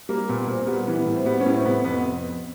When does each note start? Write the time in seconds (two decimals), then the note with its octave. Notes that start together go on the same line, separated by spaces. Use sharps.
0.09 G3 A#3
0.28 A#2 B3
0.48 A#2 C4
0.59 A#3
0.67 G3 B3
0.87 E3 B3
1.06 A2
1.16 C4
1.26 G3 B3
1.40 C#4
1.46 A2
1.53 C4
1.65 C3 B3
1.84 F2 B3